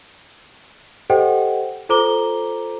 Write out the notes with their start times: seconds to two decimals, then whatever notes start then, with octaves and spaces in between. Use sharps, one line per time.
1.10 G4 A4 C5 D#5 F#5 G5
1.89 F4 A4 C5 A#5 D6 G7